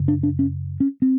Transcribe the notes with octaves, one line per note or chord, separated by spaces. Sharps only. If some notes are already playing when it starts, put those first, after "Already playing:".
Already playing: F#2 C#3
D4
D4
C#4
C#4
C4